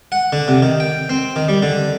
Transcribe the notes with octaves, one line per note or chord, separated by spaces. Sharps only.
F#5
D3
C3
D#3
G5
C4
D#3
G3
D3